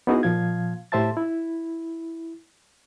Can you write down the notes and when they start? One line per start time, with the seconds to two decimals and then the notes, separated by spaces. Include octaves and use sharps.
0.07 B3 C#4 D#4 E4 F#4 G#4
0.23 A#2 F3 F5 G#6
0.92 A2 G4 C5 E5 A5 A6
1.17 E4